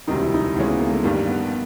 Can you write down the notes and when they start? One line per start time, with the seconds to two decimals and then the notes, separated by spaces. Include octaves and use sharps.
0.07 E1 D2 C3 D#3 G3 D#4
0.21 E4
0.34 D#4
0.56 D2 C#3 E3 G#3 C#4
0.68 B3
0.80 A#3
0.92 A3
1.03 A1 G2 D#3 G3 A#3
1.27 B3